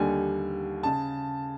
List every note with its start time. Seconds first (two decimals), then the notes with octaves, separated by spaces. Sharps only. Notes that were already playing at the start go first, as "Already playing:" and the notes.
Already playing: D#2 D3 G3 G#5
0.83 C#3 A5